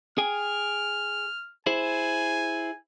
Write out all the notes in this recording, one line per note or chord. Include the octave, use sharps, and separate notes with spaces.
G#4 G5 G#5 F6
E4 G#4 C5 G#5